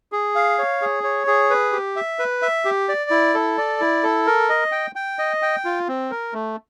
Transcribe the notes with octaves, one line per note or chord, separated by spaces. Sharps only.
G#4
F5
C#5
G#4
C#5
G#4
B4
G4
E5
B4
E5
G4
D5
E4
A4
D5
E4
A4
A#4
D#5
G5
G5
D#5
G5
F4
C4
A#4
A3